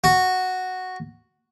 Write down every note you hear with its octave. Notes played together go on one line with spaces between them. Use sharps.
F#4